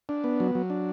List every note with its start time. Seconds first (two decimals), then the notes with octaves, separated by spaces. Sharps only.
0.09 D4
0.24 B3
0.40 F#3
0.55 F#3
0.70 D4